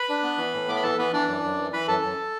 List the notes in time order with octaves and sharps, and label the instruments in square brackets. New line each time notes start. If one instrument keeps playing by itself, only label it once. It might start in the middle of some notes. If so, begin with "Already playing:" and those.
Already playing: [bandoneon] B4 B5
D4
B3
E3
A2
B3 D6
B5
E3 A4 A5
E3 B3 B4
E3 D4 D5
F#2
F#2
E3
E3 B4 B5
F#2 A4 A5
F#2